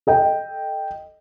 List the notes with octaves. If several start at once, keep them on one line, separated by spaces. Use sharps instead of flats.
A4 D#5 G5